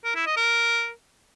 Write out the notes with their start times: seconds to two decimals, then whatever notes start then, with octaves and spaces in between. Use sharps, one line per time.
0.04 A#4
0.15 E4
0.26 D#5
0.37 A#4